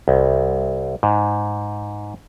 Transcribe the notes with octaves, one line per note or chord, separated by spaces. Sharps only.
C2
G#2